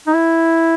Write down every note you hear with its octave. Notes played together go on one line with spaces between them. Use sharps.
D#4
E4